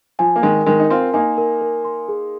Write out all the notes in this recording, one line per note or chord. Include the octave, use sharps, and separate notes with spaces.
F3 G#5
A#3
D#3 G#3 A#4
D#3 G#3 A#4
D#4
C4 F4 C6
A#3 D#4 G#5
A#4
A#4
C6
G#4